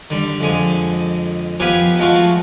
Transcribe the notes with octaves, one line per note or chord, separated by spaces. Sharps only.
D3 G3
F2 D3 G#3 D#6
F3 B3 F4 G4 G#4 B4
F3 G#3 A3 F4 F#4